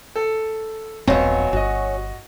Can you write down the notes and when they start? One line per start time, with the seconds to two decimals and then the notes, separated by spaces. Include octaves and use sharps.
0.16 A4
1.07 D#1 B1 F#3 C4 C#4 F5
1.53 G1 F#4 D#5